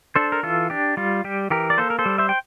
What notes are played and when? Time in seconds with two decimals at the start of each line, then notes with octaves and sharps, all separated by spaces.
0.16 D4 A4 C5
0.32 A#4
0.43 E3 F4 A4
0.70 D4 G4
0.97 G3 F4
1.24 G3 G4
1.50 E3 G4 A#4
1.70 D5
1.78 A#3 A4 C5
1.90 A#4
1.99 A4 C5
2.06 G3
2.18 C5 E5
2.29 G5